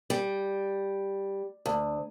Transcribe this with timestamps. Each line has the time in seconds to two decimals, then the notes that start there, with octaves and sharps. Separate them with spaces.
0.10 G3
1.66 D2